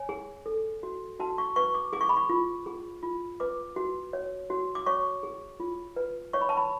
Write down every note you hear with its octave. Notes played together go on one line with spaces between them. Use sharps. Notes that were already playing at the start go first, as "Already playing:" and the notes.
Already playing: C#5 G#5
G#4
A4
F#4
F#4 A5
C#6
B4 C#6
D6
G#4 D6
C#6
B5
C#6
F4
G#4
F4
B4 D6
F#4
C#5
F#4
D6
C#5 C#6
G#4
F4
B4
C#5 C#6
B5
A5
B5